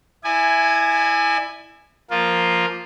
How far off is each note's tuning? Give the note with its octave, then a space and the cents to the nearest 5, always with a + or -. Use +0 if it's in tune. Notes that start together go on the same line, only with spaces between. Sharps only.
E4 +0 D5 +40 G#5 +0
F3 +0 A#3 +0 F4 +5